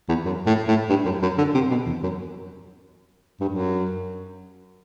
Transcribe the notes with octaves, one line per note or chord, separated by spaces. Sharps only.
E2
F#2
A2
A2
G2
F#2
F#2
D3
C3
B2
E2
F#2
G2
F#2